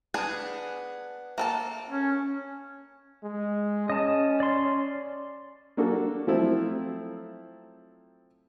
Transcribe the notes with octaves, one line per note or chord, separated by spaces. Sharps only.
B3 D4 G#4
A#3 A4 A5
C#4
G#3
C#4 D#5 A5
D5 C6
A#3 D4 F#4 A4
F3 F#3 A3 C4 E4